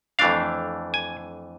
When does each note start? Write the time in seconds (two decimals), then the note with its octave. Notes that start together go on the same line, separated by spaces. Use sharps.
0.19 F2 E3 A3 D4 F5
0.94 G#5